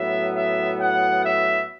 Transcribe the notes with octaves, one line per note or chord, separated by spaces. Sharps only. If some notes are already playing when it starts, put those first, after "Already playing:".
Already playing: A2 F#3 B3 E5
E5
F#5
E5